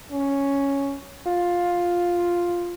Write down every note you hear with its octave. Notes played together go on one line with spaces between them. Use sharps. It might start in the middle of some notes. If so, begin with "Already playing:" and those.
C#4
F4